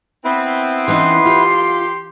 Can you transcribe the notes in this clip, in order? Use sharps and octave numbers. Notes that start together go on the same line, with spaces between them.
B3 C4 E4 B4
E3 C#4 D#4 C6
F4 G4